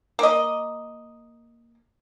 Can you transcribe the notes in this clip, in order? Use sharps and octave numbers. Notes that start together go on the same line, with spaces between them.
A#3 D#5